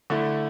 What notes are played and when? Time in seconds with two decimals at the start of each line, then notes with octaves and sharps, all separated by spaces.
0.10 D3 A3 E4